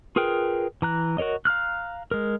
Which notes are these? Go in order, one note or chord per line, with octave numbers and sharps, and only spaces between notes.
F4 G#4 A#4 B4 G5
E3 A#5 F#6
F#4 A#4 C#5 D#5
F5 A#5 F6 F#6
G#3 A#4